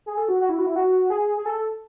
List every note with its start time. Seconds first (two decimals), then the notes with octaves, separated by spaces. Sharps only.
0.06 G#4
0.17 A4
0.29 F#4
0.41 F#4
0.49 E4
0.59 F#4
0.67 E4
0.76 F#4
1.10 G#4
1.37 G#4
1.46 A4